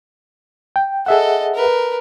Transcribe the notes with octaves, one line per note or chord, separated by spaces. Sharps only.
G5
G#4 A4 D#5 E5 F#5
A#4 B4